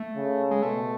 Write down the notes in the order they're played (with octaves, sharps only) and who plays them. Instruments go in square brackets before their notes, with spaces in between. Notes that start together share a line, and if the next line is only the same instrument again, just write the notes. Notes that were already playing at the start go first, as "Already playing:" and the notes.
Already playing: [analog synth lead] A3
[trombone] C#3
[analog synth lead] G#3
[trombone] B2 [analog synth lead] A3